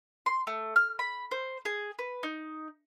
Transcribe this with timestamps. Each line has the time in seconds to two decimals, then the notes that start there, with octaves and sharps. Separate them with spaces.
0.26 C6
0.47 A3
0.76 F6
0.99 B5
1.31 C5
1.65 G#4
1.99 B4
2.23 D#4